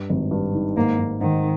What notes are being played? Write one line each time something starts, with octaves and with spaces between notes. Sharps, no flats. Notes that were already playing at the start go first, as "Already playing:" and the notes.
Already playing: G2
G#1
G2
D#3
G#2 A#3
G#2
G#2 D#3